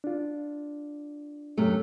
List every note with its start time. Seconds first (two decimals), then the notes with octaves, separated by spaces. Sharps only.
0.04 D4 F4
1.57 F#2 C3 A3